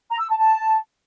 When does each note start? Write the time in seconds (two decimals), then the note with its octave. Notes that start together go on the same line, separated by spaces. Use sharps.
0.09 A#5
0.19 E6
0.29 A5
0.39 A5